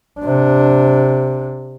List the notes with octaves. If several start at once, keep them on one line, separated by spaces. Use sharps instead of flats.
C3 D4